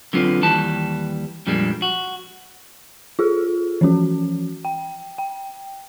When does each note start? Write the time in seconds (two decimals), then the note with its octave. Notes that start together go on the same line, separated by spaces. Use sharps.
0.13 D3 F#3 C4 F4 B4
0.42 D#2 E3 G3 A5
1.47 F2 A#2 G3 G#3 A#3 D4
1.82 F#4
3.19 F4 G#4 A4
3.81 E3 F3 C#4 F#4
4.65 G5
5.18 G5